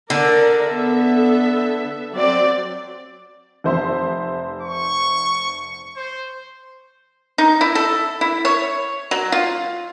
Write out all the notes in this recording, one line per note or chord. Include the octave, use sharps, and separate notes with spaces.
D3 A#4 D5
B3 A4 E5
F#3 C4 D5
F1 C5 E5
C#6
C5
D#4
E4
A4
E4
C#5
F#3
F4